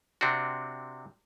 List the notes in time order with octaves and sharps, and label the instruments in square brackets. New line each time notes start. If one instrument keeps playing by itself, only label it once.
[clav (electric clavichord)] C3 C4 D4 F#4